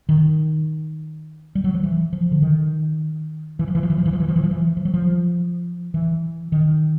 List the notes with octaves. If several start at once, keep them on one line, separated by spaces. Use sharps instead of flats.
D#3
G3
F#3
F3
E3
F3
D3
D#3
E3
F3
E3
F3
E3
F3
E3
F3
E3
F3
E3
F3
E3
F3
F#3
F3
E3
D#3